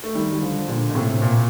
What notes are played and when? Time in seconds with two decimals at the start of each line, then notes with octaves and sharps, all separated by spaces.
0.04 A3
0.15 D#3 G3
0.31 G3
0.41 D3 F3
0.68 A#2 D3
0.90 A#2
0.95 A2 C3
1.22 A#2